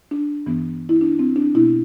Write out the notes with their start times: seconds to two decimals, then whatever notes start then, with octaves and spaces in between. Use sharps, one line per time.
0.11 D4
0.46 G2 E3 B3
0.89 E4
1.01 D4
1.19 C4
1.36 D4
1.55 B2 B3 E4